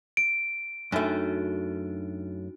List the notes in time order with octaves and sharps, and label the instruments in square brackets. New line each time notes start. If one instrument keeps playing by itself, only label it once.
[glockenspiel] D7
[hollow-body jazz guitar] F#2 A3 [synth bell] D4 D#4 F#4